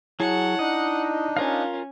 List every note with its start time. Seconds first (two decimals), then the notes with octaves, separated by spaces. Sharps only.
0.20 F#3 E4 G#4 C#5 F#5 A5
0.59 D4 D#4 D#5
1.37 C#4 F4 A#4 F5